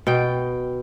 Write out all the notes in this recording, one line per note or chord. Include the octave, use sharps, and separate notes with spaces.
B2 G5